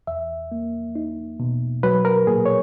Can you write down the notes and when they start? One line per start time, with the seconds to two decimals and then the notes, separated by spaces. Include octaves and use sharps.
0.07 E2 E5
0.52 A#3
0.95 D#4
1.40 B2
1.83 F#3 B4
2.05 A#4
2.27 A#2 G#4
2.46 C#5